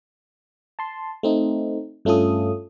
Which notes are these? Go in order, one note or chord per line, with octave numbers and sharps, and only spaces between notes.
A5 C6
A3 C4 D#4
G2 A3 C#4 F4 A4 D#6